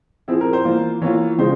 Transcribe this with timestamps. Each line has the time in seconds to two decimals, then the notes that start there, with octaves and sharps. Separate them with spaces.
0.28 F3 C4 E4 G#4
0.41 A#4
0.53 C5
0.65 E3 A#3 F4
1.02 E3 A#3 F4 C#5
1.38 C#3 F3 G#3 C5